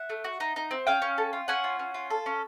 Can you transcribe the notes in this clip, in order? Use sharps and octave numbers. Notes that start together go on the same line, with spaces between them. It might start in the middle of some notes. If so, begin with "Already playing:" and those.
Already playing: E5 F#5
A3
F#4
D#4
D#4
C4
C#4 F5 G5
C#4
A4
F4
C#4 F#5 G#5
F4
C#4
F4
A4
C#4